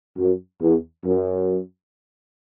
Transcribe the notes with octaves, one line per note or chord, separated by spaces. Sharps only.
F#2
E2
F#2